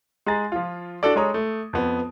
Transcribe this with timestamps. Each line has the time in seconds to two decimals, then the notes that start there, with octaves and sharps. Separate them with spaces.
0.26 G#3 G#4 A#5 A6
0.52 F3 F4
1.03 D4 F#4 A4 D5
1.16 G#3 A4 C#5 A#5 D#6
1.34 A3
1.73 F2 B3